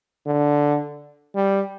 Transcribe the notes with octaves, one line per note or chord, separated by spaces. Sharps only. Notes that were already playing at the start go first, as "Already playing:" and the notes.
D3
G3